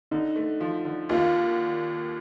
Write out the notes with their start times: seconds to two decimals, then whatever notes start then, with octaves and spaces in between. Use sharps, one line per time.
0.11 D3 D#4
0.36 A3
0.60 F3
0.85 D3
1.09 D#2 F4